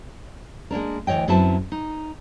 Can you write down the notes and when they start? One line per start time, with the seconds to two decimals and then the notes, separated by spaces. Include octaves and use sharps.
0.71 G#3 A#3 D4 A#4
1.07 D2 E3 C#5 D#5 G5
1.28 F#2 F#3 C4 E4 B4 A5
1.72 D#4